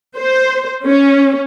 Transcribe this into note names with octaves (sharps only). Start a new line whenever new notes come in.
C5
C#4